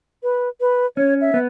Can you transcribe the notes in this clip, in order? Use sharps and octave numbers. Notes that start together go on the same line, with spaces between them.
B4
B4
C#4 C#5
E5
B3